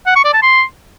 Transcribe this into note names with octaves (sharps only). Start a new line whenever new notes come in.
F#5
C#6
D5
A5
C6